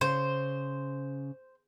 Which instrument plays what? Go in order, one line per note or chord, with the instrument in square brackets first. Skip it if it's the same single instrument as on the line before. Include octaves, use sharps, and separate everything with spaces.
[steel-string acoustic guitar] C#3 [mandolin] C5